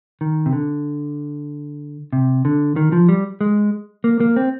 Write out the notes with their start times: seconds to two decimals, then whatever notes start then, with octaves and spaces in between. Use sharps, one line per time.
0.21 D#3
0.46 C3
0.53 D3
2.13 C3
2.45 D3
2.76 D#3
2.92 F3
3.09 G3
3.41 G#3
4.04 A#3
4.20 A#3
4.36 C4